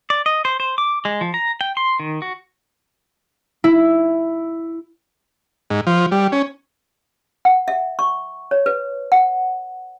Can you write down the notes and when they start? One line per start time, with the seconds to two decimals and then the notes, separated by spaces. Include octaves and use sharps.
0.10 D5
0.26 D#5
0.45 C5
0.60 C5
0.78 D6
1.05 G#3
1.21 F3
1.34 A#5
1.61 G5
1.77 C6
2.00 D#3
2.22 F#4
3.64 E4
5.70 G#2
5.87 F3
6.11 G3
6.32 C#4
7.45 F#5
7.68 E5
7.99 C#6
8.51 C#5
8.66 B4
9.12 F#5